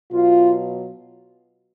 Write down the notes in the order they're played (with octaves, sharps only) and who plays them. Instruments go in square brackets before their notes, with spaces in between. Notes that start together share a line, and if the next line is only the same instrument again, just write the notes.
[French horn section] B2 F#3 F4